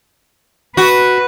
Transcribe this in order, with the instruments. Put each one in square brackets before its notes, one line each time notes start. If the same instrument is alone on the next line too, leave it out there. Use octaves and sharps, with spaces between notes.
[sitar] F#4 [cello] B4